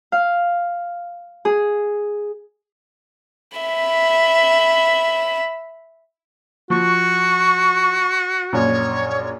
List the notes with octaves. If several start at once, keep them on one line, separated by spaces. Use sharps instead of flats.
F5
G#4
E5 B5
F3 F#4 C#6
A#1 F#2 C#5